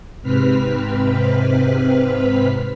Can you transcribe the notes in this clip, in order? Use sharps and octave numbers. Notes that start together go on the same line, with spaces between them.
G#2 C3 C4 B4 F6 B6